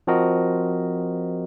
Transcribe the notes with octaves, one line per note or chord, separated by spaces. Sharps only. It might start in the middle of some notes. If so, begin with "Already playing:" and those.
F3 C4 F#4 A#4 D#5